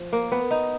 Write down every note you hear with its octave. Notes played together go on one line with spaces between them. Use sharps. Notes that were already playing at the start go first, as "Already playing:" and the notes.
Already playing: F3
A#3
B3
D#4